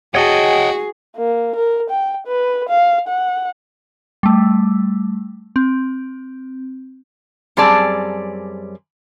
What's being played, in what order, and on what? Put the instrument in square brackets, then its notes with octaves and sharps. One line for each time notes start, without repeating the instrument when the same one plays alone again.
[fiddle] F#4 [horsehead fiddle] G#4 [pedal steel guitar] C#5 D#5 A5 [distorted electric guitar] F#5 G5
[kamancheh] A#3
A#4
G5
B4
F5
F#5
[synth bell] G3 A3
C4
[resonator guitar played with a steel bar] F#2 G3 C4 G#4 D5 A5